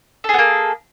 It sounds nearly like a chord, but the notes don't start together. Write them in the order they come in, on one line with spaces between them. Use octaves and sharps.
A4 G#4 B3 A#3